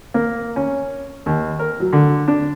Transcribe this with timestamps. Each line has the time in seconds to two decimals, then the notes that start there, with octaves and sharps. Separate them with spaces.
0.14 A#3
0.56 C#4
1.26 D#2
1.59 A#4
1.80 F#3
1.93 D3
2.28 D4